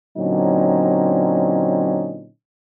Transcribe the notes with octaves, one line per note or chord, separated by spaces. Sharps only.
A#2 D3 F#3 C4 C#4 D#4